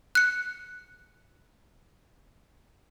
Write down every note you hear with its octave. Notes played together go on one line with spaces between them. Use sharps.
F#6 C#7